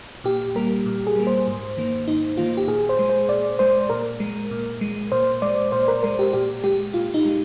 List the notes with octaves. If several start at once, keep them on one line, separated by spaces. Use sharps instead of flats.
A#2 G4
G3 A#3 A#4
A#2
G#4
G3 A#3
C5
G#2
D#3 A#3
G#2 D#4
D#3 A#3 F4
G4
A#2 G#4
C5
G#3
C5
A#2 D5
G#3 C5
A#2 A#4
G#3
A#2
G#3
A#2 C5
G#3 D5
A#2 C5
A#4
G#3 A#4
G4
A#2 G4
G#3 G4
A#2 F4
D#4
G#3